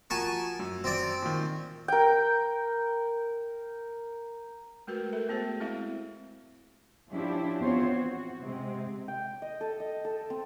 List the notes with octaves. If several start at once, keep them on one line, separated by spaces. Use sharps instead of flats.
F3 F#4 A#4 G#5 A5 C#6
F#2
C4 D5
A#2 D#3
A#4 G5
G#3 A3 F#4 A#4 B4
A4 A#4 E5
A3 B3 F#4 G#4 C5
G#3 C4 E4 E5 F5
F3 C#4 D4 E4 G4
E2 B3 C4 F4 C5 C#5
F#4
C3 G#3 C4
G5
D#5
A4
D#5
A4
C4